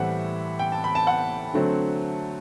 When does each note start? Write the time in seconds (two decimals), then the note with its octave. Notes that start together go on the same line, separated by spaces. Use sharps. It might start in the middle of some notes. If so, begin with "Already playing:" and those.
Already playing: A2 E3 G3 C4 E5 F#5
0.59 G5
0.72 A5
0.84 B5
0.95 A5
1.07 F#5
1.54 D3 F#3 A3 C4